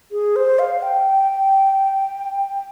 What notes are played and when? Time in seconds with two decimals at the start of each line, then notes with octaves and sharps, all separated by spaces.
0.12 G#4
0.36 C5
0.59 F5
0.82 G5